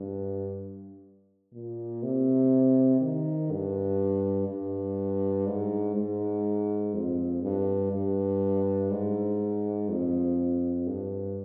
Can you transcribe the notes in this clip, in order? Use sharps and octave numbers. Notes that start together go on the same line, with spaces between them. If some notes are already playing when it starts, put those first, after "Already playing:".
Already playing: G2
A#2
C3
D#3
G2
G2
G#2
G#2
F2
G2
G2
G#2
F2
G2